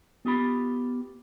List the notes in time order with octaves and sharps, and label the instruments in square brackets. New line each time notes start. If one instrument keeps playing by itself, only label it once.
[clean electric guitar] B3 F4 G4 B5